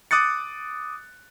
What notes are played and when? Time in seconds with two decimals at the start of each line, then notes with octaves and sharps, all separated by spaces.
0.11 D6 D#6 F#6 A6 C#7